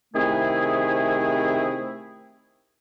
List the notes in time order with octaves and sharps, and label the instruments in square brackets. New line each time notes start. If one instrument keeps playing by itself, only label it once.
[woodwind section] C3 D#3 A3 C4 E4 G#4